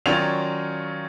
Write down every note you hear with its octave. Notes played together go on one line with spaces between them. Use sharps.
D#3 F#3 C#4 F4 D5 F7